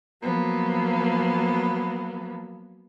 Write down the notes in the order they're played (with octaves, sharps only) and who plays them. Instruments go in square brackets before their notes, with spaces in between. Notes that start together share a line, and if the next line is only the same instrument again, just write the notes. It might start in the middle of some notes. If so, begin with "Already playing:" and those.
[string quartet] F3 F#3 A#3 B3